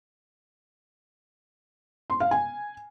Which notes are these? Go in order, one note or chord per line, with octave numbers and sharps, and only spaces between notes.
C6
F5
G#5